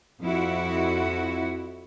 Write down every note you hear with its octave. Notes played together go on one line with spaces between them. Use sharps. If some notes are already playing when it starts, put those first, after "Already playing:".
F2 E4 F#4